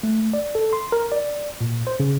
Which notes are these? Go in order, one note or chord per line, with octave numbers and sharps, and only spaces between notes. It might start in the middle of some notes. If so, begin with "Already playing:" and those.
A3
D5
A4
C6
A#4
D5
A#2
C5
C#3